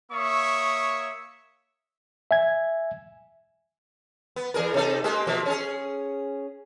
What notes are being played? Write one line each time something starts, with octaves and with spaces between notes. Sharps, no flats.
A#3 C#5 E5 C#6 D#6
E5 G#5 G#6
B3
E2 G#4 A#4
C3 D#4 A4
G#3 A#3 G4
B2 F3 A#3
C#4 G#4